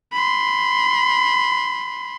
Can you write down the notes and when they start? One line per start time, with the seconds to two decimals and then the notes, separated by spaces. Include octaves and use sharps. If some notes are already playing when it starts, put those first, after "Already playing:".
0.13 B5 C6